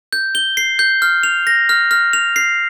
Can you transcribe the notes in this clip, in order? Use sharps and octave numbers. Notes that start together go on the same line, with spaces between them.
G6
G7
C7
G6
F6
F7
A#6
F6
F6
F7
C7